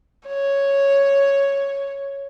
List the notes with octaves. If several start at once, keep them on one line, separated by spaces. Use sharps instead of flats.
C#5